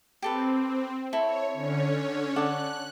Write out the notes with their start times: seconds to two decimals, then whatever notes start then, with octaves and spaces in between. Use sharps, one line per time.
0.22 C4 G4 A4 B4
1.13 E4 A4 C#5
1.53 D3 C#4 C#5
2.36 A4 D5 F#5 F#6